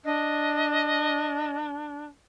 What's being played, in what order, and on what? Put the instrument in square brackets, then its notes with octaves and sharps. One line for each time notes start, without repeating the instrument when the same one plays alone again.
[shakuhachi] D4 [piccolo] D#5